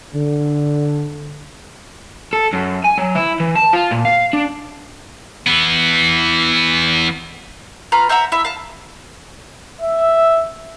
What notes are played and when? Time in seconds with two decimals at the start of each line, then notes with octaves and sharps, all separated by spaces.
0.14 D3
2.33 A4
2.53 F#2
2.84 G#5
2.98 F#3
3.15 E4
3.40 E3
3.55 A5
3.73 F4
3.91 A#2
4.05 F5
4.33 D4
5.47 E3 B3
7.92 F4 B4 A#5 F6
8.09 C5 E5 F#5 A#5
8.32 E4 E5
8.45 F5 A5
9.81 E5